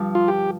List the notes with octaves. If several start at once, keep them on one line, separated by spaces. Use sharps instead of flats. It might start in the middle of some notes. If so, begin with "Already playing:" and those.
Already playing: G2 D3 F3 D4
F4
G4